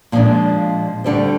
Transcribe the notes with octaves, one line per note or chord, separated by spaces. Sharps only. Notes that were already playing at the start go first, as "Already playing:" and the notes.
A#2 F3 G#3 D4
D2 D3 G3 C4